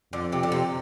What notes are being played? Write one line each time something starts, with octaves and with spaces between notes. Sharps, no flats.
F2 D3
C3
D3
C3